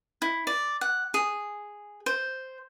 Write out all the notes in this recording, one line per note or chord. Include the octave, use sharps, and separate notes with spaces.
E4
D5
F#5
G#4
C5